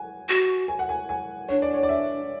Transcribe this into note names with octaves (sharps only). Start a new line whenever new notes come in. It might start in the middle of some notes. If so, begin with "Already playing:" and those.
Already playing: F#5 G#5
F#4
G#5
F#5
G#5
G#5
D4 C#5
D5
C#5
D5
E5